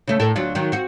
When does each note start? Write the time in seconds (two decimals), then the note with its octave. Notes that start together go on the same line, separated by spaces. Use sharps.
0.07 C#3 A3
0.20 A2 A4 A#4
0.36 D2 F#3 F4
0.55 D#3 F#3
0.72 C4 F#4